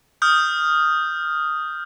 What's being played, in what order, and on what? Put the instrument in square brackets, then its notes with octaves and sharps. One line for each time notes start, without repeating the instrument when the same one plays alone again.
[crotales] D#6 F6 G6